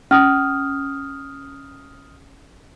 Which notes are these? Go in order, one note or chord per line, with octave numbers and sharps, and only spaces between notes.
C#4 D#6 F6